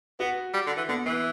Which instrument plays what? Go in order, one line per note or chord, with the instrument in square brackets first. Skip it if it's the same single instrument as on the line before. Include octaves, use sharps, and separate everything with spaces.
[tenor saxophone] B3 [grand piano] F#4
[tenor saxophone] G3
D3
E3
[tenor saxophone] D3 [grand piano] B3
[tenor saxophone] E3 [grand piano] B3